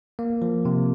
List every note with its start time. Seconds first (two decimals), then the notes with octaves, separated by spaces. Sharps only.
0.19 A#3
0.42 F3
0.65 C3